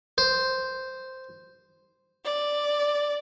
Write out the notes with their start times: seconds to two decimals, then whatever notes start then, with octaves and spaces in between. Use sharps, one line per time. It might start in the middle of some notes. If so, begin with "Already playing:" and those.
0.18 C5
2.24 D5